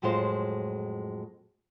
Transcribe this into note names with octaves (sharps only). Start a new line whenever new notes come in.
F2 A2 F#3 G#3 F4 C5